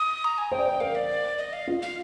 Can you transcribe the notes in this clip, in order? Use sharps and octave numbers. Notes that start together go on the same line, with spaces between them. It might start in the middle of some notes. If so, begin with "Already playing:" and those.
Already playing: D#6
A#5
G#5
C5 G5
D5
C5
A#4 F5
D5
D#5
F5
F4
F5